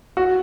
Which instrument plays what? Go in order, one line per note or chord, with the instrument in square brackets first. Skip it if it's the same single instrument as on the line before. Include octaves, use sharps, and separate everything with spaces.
[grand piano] F#4